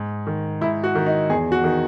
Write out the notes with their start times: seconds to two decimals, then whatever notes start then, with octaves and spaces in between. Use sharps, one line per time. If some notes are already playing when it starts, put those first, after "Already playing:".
Already playing: G#2
0.27 D#3
0.61 G#2 E4
0.84 F#4
0.95 D#3
1.06 D#4
1.30 E2 G#4
1.52 F#4
1.64 D#3